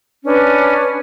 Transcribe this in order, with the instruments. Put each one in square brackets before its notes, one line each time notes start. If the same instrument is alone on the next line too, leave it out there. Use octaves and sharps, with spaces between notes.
[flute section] C#4 D4 B4